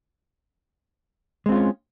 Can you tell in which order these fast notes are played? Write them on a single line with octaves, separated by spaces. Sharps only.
G#3 C4 F4 C#4